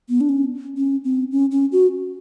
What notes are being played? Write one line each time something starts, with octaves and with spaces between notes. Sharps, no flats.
B3
D4
C#4
C#4
C4
C#4
C#4
F#4